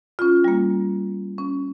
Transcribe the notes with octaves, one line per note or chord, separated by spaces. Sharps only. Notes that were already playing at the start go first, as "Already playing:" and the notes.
C#4 F4
G3 A#3
C#4